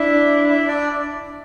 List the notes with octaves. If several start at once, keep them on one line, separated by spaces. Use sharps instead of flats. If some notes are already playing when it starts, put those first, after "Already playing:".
Already playing: D4 E4 E5
E4 E5
D4 D5